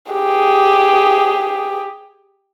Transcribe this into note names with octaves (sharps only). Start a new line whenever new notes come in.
G4 G#4